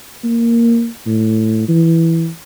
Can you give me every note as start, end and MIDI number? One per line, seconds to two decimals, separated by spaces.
0.24 0.88 58
1.07 1.65 45
1.68 2.29 52